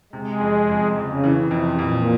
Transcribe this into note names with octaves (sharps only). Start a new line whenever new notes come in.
C3 G#3
F2
F2
F2 C#3
E3
C3
F2
F2 A#2